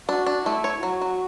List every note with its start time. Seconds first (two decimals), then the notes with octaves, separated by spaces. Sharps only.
0.08 D4 F#4
0.27 D4
0.46 A3 E4
0.64 C#5
0.83 F#3 F#4
1.01 F#3